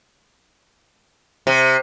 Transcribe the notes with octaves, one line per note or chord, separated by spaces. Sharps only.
C3